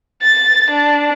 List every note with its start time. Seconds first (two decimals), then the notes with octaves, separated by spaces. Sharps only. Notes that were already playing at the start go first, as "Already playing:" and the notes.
0.22 A6
0.71 D4